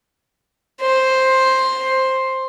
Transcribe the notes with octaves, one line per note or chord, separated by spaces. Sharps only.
C5